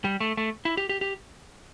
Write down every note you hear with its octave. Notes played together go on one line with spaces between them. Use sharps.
G3
A3
A3
E4
G4
G4
G4